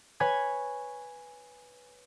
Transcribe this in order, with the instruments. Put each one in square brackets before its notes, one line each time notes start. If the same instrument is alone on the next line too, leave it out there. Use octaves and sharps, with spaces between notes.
[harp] B4 C#5 G#5 G#6